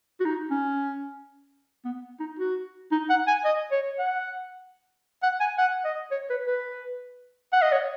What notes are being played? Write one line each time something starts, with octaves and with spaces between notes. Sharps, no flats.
F#4
D#4
C#4
B3
D#4
F#4
D#4
F#5
G#5
D#5
C#5
F#5
F#5
G#5
F#5
D#5
C#5
B4
B4
F#5
D#5
C#5